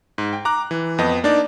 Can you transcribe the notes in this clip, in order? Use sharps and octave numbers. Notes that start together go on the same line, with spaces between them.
G#2
G5
A#5 D6 F#6
E3
F2 B3 D#5
A#3 D4 D#4 D5